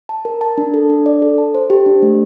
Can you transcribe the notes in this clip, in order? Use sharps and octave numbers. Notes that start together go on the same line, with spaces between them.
A5
A#4
A5
D4
A4
D4
D5
A4
A5
C5
G4
D4
A3